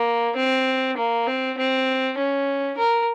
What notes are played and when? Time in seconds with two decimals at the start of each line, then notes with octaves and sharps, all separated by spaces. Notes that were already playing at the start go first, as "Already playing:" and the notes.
Already playing: A#3
0.36 C4
0.97 A#3
1.27 C4
1.58 C4
2.18 C#4
2.78 A#4